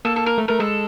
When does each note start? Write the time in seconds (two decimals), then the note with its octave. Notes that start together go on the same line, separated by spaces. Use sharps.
0.05 A#3 A4
0.16 A4
0.26 A#4
0.38 A3
0.48 A3 A#4
0.59 G#3 A4